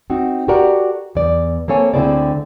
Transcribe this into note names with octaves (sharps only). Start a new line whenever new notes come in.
C4 D#4 F#4
F#4 G4 A4 A#4 D5 F#5
E2 D5
A#3 C4 A4 C#5 G#5
D2 D3 C4 E4 G#4 D5